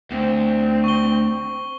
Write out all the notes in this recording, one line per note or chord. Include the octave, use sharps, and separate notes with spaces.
D2 C4
C#6 G7